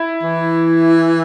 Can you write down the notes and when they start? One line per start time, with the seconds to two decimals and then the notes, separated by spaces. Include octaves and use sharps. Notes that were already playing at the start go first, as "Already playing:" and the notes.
Already playing: E4
0.23 E3